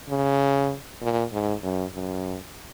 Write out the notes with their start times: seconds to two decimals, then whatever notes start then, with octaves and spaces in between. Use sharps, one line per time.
0.09 C#3
1.02 A#2
1.33 G#2
1.63 F#2
1.95 F#2